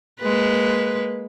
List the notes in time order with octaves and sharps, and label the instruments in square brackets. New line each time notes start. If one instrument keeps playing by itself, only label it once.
[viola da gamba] G#3 A#3 B4